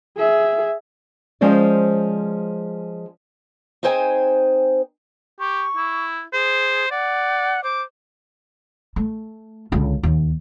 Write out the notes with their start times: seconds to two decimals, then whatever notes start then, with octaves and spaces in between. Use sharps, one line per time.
0.17 G#4 E5
1.41 F3 G#3 C#4 C5 D5
3.83 C4 D#4 G#4 C5 G5 G#5
5.40 G4 C#6
5.76 E4
6.33 G#4 C5
6.91 D5 F#5
7.64 C5 D6
8.96 A3
9.72 C#2 D3
10.03 D#2